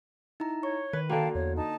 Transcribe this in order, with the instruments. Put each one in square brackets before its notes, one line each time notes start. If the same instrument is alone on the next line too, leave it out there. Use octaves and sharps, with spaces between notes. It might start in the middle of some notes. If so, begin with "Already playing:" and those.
[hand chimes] D#4 E4 A#5
[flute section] C#5 [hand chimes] C#6
[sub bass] D#3 [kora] B4
[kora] D3 A#3 [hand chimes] F#4 [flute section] F5 G5 A5
[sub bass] E2 [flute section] C#5
[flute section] D#4 A5